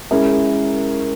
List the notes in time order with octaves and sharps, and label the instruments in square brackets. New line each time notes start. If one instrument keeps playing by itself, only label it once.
[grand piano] G#3 C#4 E4 A#4